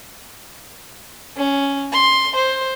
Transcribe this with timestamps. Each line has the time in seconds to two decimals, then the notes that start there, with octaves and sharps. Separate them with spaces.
1.37 C#4
1.93 C6
2.36 C5